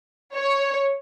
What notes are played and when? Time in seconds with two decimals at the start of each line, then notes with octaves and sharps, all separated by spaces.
0.35 C#5